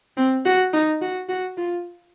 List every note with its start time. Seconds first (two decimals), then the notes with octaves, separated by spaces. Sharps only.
0.17 C4
0.45 F#4
0.73 D#4
1.02 F#4
1.29 F#4
1.57 F4